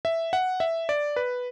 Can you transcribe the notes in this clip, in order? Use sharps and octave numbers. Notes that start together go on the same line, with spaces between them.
E5
F#5
E5
D5
B4